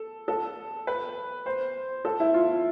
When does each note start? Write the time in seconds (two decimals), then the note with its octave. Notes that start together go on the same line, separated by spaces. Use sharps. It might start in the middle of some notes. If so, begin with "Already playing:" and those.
Already playing: A4
0.28 A4
0.87 B4
1.46 C5
2.05 A4
2.20 E4
2.34 F4